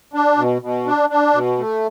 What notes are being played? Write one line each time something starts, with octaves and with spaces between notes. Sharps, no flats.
D4
B2
B2
D4
D4
B2
A3